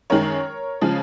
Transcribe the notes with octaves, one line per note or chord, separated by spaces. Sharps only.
F#2 D#3 G#3 A#4 C#5
C#3 F3 G#3